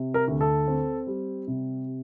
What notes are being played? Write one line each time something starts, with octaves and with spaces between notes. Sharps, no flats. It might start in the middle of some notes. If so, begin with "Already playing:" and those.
Already playing: C3
A#4
D2
A4
C4
G3
C3